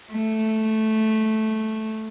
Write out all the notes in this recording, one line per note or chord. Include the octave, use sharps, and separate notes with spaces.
A3